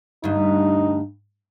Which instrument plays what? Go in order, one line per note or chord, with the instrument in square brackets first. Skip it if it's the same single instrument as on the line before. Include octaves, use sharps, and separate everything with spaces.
[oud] D2 G2 [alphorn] D#4